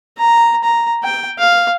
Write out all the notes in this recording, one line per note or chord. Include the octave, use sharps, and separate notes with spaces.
A#5
A#5
G5
F5